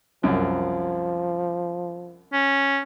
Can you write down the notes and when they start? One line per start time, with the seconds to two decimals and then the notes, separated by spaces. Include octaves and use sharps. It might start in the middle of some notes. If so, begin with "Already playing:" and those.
0.23 C2 F#2 F3
2.33 C#4